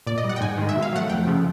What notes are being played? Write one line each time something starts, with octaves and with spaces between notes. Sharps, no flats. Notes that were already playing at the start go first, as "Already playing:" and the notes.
A#2 D5
D#5
G3
F#5
G5
G#2 G#5
D#3 G#3
E5
B2
F5
F#3 A3 F#5
F2 G5
C#3 F3 A3